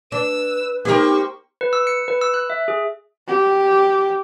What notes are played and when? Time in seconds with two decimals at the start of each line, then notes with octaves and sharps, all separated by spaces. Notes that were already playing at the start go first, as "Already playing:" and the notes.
0.12 D4 B4 E6
0.85 B3 D#4 G4 A#4 C5 C#6
1.61 B4
1.73 E6
1.87 C#7
2.08 B4
2.21 E6
2.34 F#6
2.50 E5
2.68 G#4
3.27 G4